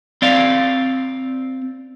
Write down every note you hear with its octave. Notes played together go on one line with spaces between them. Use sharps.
C4 D5 F5